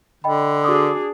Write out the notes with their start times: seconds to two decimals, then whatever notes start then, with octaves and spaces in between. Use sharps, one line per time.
0.24 D3 D#5 G5 B5
0.64 D4 F#4 G#4 D6 D#6